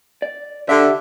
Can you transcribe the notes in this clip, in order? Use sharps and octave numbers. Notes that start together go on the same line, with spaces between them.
D5
D3 G4 E5